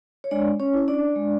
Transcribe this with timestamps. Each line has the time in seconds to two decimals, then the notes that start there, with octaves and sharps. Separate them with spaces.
0.24 C#5
0.31 G#3 D4 D5
0.60 C#4 C#5
0.74 C#4 E4
0.88 D4 D5
1.16 G#3